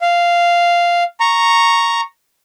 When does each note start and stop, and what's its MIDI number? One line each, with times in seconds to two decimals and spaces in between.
0.01 1.03 77
1.20 2.01 82
1.20 2.01 85